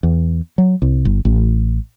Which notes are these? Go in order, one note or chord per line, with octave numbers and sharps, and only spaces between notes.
E2
F#3
C2
G1
A1